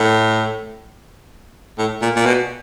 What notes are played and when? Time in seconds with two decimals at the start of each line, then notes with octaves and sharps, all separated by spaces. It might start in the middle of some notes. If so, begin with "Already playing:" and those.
Already playing: A2
1.79 A2
2.02 A#2
2.16 A#2
2.26 B2